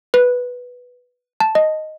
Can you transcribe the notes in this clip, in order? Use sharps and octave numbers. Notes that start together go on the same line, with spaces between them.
B4
A5
D#5